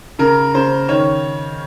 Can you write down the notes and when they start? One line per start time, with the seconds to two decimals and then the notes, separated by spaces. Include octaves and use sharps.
0.19 C#3 A#4
0.54 C#3 C5
0.89 D#3 C#5